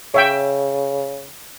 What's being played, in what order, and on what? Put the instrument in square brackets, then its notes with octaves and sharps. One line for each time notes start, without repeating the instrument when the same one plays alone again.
[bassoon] C#3 [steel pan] C#5 E5 G5